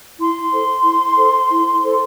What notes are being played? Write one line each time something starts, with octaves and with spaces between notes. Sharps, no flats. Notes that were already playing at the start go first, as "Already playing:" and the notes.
E4 C6
A4 C5
E4
A4 C5
E4
A4 C5